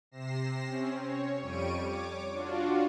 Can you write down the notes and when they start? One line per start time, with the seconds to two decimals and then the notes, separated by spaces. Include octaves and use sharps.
0.11 C3 A#6 C7 E7
0.67 C4 C#4
0.99 C#5
1.41 F2 G3 C#6 D7 D#7
1.82 C#5 D6
2.33 D4 F4 F#4